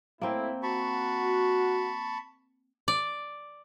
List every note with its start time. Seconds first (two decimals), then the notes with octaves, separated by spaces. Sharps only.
0.22 A2 A#3 C4 E4
0.63 F#4 A5 B5 C#6
2.88 D5